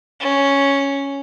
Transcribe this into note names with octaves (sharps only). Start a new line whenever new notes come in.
C#4